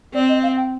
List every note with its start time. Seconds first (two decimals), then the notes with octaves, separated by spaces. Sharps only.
0.14 C4 D5
0.29 D#5
0.43 F5
0.56 G5